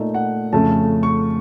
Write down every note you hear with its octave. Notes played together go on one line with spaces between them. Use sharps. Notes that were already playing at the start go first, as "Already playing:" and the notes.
Already playing: A#2 A3 D#4
F#5
F2 C#3 A3 C#4 A5
C#6